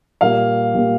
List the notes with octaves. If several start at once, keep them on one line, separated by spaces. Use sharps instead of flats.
A#2 G3 A#3 F5
A#2 G3 A#3